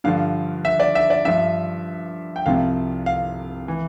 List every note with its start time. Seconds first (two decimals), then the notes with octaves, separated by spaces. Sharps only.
0.04 G2 D3 F3 F5
0.65 E5
0.80 D5
0.95 E5
1.10 D5
1.25 G2 F3 E5
2.36 G5
2.46 C2 C3 F3 F5
3.06 F5
3.68 E3